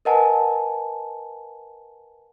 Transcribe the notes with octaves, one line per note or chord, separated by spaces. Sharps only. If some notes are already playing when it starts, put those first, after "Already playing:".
A#4 B4 D#5 F#5 G#5 A5